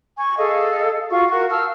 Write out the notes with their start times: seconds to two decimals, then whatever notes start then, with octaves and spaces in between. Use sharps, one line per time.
0.17 G#5 C#6
0.38 G#4 A4 D#5 F5
1.10 F4 F#4 F5 C#6
1.30 F#4 A#4 C#6
1.50 F5 A5 E6 F6